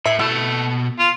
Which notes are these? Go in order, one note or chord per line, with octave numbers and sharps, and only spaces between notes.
A2 E5
B2 A3 E4 A5
F4